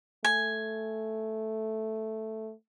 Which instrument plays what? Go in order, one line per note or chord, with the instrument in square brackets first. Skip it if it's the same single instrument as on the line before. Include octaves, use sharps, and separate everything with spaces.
[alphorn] A3 [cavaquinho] G#5